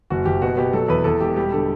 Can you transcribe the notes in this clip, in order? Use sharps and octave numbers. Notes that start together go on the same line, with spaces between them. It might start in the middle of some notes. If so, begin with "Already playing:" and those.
F#1 F#4
F#1 G4
B2 F#4
B2 G4
F#3 A4
E2 B4
E2 A4
E1 G4
G3 G4
D3 A4